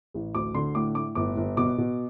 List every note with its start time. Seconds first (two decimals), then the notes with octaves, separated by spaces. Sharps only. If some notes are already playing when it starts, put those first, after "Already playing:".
0.14 A1
0.35 D2 D6
0.54 D3 C6
0.75 A2 D6
0.95 A2 D6
1.15 G1 D6
1.37 G1
1.57 B2 D6
1.78 B2